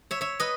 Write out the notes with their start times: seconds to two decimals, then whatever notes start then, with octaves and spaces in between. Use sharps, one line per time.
0.11 C#5 E5
0.21 C#5 E5
0.40 B4 D#5